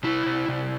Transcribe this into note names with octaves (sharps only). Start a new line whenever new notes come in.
C3 E4
C3
C3